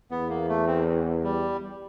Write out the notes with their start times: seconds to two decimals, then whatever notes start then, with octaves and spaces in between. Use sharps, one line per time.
0.11 E2 B3
0.29 A#3
0.49 A3
0.67 C4
1.23 G3